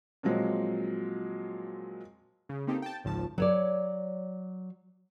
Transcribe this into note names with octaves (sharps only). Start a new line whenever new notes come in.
A#2 F3 F#3 G#3 C4
C#3
A#3 C4 D#4 G4 A4
G5 A5
G#1 C#2 F3 A5
F#3 C#5 D5